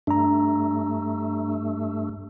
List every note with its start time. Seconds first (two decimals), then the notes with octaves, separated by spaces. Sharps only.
0.07 G2 A3 D4 A#5